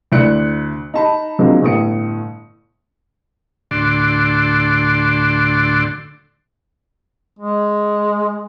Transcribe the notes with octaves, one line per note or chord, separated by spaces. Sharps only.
D2 E4 D5 F#6 C#7
D#4 A5 B5
D3 F3 F#3 G#3 A#3 C4
G1 A2 D#6 C#7
D2 A2 D3 F#4 D5 C6
G#3